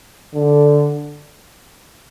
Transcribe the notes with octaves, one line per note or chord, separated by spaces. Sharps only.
D3